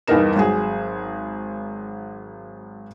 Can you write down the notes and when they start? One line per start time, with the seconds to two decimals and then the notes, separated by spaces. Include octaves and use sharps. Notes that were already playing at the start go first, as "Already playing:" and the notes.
0.08 E2 G2 B3 D#4 A#4 E7
0.36 G#1 F#3 G#4